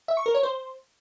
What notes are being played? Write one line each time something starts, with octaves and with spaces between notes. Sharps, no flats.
E5
C#6
A#4
C#5
C5